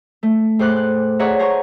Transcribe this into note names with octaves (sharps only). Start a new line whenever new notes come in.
A3
A2 G#4 C5 C6 D6 F#6
F#6
G#4 C#5 D5 E5 F#5 A#5
C5 G#5 A#5 C#6